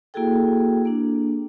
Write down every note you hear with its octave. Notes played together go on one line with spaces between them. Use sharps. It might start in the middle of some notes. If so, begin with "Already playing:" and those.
A#3 E4 F#4 G#4 A4 G5
A#3 D4